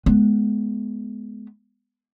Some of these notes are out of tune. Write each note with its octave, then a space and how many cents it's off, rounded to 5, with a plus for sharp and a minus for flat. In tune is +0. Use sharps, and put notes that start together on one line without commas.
G#3 +25 B3 +0